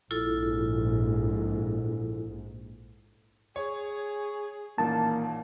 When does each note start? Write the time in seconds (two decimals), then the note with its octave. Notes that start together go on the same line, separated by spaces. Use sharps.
0.11 A#1 G#2 E4 F4 A4
3.56 G#4 C#5
4.78 A1 A#2 D#3 A#3 A5